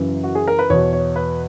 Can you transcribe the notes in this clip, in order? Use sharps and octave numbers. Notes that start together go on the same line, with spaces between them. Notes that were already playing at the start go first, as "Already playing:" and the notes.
Already playing: F#2 C#3 E3
F#4
G#4
A#4
B4
E2 B2 C#5
C#5
B4